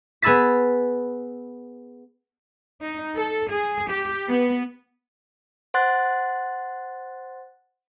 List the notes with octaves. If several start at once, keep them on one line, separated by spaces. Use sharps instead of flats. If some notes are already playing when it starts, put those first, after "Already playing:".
B3 G#4 B5 E6 A6 B6
D#4
A4
G#4
G4
B3
C5 F#5 C6 F#6 A6